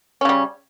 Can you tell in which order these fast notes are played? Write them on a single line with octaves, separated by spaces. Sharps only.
C#4 C#3 G3